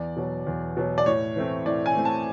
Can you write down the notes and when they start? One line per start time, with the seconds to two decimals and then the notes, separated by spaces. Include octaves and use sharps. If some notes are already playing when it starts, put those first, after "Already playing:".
Already playing: E2 D5
0.16 B2 F#3
0.47 E2
0.77 B2 F#3
0.98 D5
1.06 A2 C#5
1.36 E3 A3 C4
1.66 A2 D5
1.86 G#5
1.95 E3 A3 C4
2.05 A5